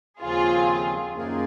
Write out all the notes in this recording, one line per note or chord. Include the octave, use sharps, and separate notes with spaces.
D#2 C#3 F3 C4 F4 G#4
F#2 D#3 A#3 F4 G#4